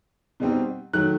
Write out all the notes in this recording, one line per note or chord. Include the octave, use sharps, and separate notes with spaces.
B2 G3 C4 D#4
D#3 F#3 A3 F#6